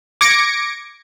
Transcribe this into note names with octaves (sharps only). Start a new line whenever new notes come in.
D6 G#6 A#6 C#7 D7